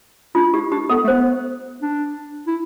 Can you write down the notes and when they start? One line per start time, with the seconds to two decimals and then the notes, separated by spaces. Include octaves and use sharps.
0.35 D4 F4
0.53 E4 G4
0.71 D4 G4
0.89 B3 A4
1.04 A3
1.08 B3 C5
1.82 D4
2.47 E4